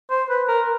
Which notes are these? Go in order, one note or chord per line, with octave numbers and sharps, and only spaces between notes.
C5
B4
A#4